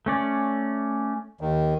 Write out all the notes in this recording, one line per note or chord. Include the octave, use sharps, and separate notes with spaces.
A3 C#4 D5
D#2 D#3